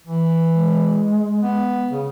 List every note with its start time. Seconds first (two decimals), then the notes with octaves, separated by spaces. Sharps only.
0.07 E3
0.53 G#3
1.43 B3
1.89 C#3